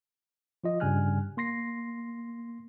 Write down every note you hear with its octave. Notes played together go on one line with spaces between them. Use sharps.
F3 F4 D#5
G2 C#3 G3 G#5 F6 F#6
A#3 C6 A#6 C7